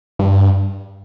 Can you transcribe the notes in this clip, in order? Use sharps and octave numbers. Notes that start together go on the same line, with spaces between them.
G2